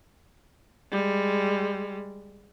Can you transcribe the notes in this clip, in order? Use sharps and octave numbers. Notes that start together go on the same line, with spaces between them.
G3 G#3